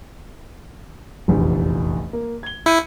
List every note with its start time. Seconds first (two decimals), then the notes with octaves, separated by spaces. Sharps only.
1.28 F1 A#1 E2
2.13 A#3
2.43 G#6 G7
2.66 E4 G6 C#7 D#7